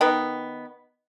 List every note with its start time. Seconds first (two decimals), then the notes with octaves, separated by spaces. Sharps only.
0.01 D#3 B3